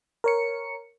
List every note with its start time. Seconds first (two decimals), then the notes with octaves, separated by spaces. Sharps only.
0.24 A#4 C#5 C#7